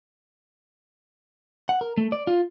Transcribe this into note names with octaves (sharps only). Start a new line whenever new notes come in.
F#5
A#4
A3
D5
F4